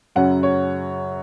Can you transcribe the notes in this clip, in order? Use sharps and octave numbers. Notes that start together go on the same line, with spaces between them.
F#2 C#3 F#3 C#4 F#5
C#5